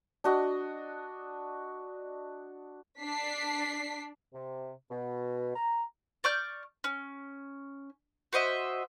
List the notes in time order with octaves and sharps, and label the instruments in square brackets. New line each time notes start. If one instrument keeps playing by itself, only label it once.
[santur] D4 F#4 D#5
[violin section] D4 B6 C7
[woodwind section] C3
B2
A#5
[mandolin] D5 C#6 F6 G6
C#4
F#4 C5 D#5 E5